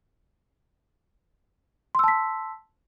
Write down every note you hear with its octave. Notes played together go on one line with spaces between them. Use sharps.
A5 C6 E6 B6